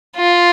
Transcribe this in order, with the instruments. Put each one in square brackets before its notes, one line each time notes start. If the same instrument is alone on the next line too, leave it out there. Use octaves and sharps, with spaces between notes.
[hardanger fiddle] F4